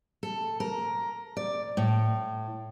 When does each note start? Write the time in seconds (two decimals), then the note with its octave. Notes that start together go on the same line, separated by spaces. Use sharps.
0.23 A4
0.60 A#4
1.37 D5
1.77 A2